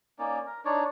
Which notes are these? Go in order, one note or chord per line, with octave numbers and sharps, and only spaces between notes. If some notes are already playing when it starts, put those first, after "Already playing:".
A#3 C#4 D#4 D5
A#4
D4 D#4 C#5 D5